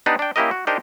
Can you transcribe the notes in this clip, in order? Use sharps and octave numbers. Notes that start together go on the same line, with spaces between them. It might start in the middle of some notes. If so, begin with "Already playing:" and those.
B3 D4 D#4 G4 B4 D5
D4 G5
A#3 C#4 E4 G4 A#4 D#5
F#4
D4 D#4 G4 A#4 C5 D#5